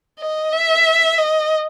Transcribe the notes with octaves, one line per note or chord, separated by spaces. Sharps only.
D#5
E5
D#5